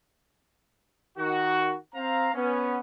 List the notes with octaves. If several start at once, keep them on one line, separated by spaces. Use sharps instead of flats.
D#3 F#4
C4 F5 A#5
B3 C#4